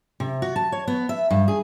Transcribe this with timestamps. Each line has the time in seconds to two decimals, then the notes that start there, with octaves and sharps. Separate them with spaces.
0.20 C3
0.42 F#4
0.56 A5
0.72 C#5
0.88 B3
1.09 E5
1.30 G2
1.48 G#4